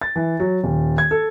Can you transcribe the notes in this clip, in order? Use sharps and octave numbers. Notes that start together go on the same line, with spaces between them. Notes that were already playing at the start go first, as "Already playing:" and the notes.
A6
E3
F#3
D#1
G#6
A4